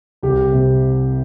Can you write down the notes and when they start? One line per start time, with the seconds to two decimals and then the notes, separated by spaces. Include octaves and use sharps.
0.23 C2 G4
0.52 C3